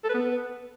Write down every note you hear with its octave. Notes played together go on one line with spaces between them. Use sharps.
A4
B4
B3